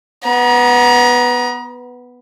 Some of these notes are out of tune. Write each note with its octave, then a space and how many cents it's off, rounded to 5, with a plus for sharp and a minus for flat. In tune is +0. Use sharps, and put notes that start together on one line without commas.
B3 +0 A#5 +35